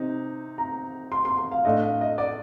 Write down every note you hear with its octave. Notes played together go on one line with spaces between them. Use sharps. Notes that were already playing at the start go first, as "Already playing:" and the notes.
Already playing: C3 C4 D#4
A#5
C6
C6
C6
F5
A2 A3 D4 D#5
F5
D#5
D5